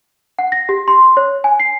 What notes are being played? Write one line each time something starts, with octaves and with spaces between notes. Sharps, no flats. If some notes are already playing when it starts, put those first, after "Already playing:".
F#5
A#6
G4
C6
C#5
G#5
C7